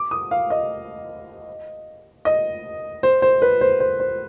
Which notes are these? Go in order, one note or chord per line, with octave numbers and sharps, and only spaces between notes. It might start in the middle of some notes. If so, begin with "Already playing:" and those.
Already playing: D6
D#6
F5
D#5
D#5
C5
C5
B4
C5
C5
C5